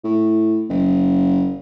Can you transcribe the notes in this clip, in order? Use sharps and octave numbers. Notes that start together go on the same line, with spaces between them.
A2
F#1